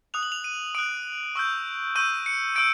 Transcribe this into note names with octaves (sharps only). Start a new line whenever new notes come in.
D#6 F#6 F7
F#7
F7
D#7
D#6 F#6 D7
C#6 E6 G6
C#6 E6 G6 D#7
C#7
E6 G6 D7